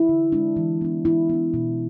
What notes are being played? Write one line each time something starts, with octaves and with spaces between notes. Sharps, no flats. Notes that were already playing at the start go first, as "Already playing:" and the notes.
Already playing: E4
D3
G#3 D4
E3
B3 D4
E3 E4
B3 D4
B2